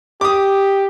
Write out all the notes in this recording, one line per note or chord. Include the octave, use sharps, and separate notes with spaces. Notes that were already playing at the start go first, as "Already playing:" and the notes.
G4 D6 D#6